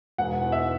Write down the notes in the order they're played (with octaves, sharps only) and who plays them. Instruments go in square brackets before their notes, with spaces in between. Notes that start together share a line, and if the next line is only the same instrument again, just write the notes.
[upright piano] E1 F#5
E2
E5